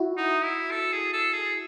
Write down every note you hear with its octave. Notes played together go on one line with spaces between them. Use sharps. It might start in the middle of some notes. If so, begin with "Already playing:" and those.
Already playing: E4 F#4
D#4
E4
A4
G#4
A4
G#4